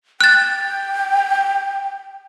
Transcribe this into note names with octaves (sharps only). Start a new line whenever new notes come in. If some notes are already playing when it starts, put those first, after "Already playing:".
G5 F#6 A6